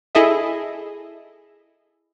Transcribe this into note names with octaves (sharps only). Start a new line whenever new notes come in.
E4 G#4 A4 D#5 E5